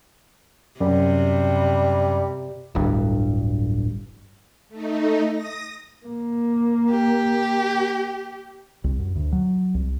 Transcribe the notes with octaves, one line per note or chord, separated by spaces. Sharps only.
F#2 C3 G3
D1 G1 G2
A3 D#4
D#6 A#6
A#3
G4
C2
F#2
D2
F#3
C2